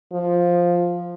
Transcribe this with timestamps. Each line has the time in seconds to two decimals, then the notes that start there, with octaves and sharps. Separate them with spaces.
0.13 F3